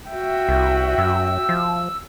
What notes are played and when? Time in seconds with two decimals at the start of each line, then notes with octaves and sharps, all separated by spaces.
0.12 F#4 E5 G5
0.49 C2
0.98 F#2 E6
1.49 F3